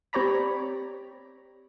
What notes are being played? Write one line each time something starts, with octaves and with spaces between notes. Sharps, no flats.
C4 G4 C#5 D5 A#5 B5